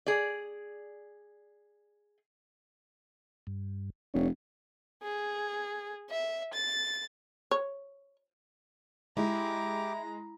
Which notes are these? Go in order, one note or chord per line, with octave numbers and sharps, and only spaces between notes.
G#4 D5
G2
F1 D4 C#5
G#4
E5
A6
C#5
G#3 E4 G4 A#5 D6